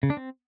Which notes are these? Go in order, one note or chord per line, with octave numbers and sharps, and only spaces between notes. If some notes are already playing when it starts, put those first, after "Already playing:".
C#3
D4
C4